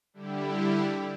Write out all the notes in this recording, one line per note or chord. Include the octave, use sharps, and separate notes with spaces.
D3 G3 E4 G4